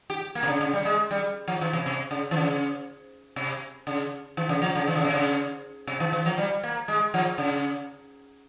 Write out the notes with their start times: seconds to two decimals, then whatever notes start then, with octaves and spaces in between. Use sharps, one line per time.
0.10 G4
0.35 A#3
0.43 C3
0.48 C#3
0.61 C#3
0.73 G3
0.85 G#3
1.11 G3
1.48 F3
1.61 E3
1.73 C3
1.86 C3
2.11 C#3
2.31 E3
2.37 C#3
3.36 C3
3.87 C#3
4.37 E3
4.49 C#3
4.62 F3
4.75 C#3
4.88 E3
4.95 C#3
5.05 C3
5.13 C#3
5.87 C3
6.00 E3
6.13 E3
6.26 F3
6.38 G3
6.63 A#3
6.88 G#3
7.14 F3
7.38 C#3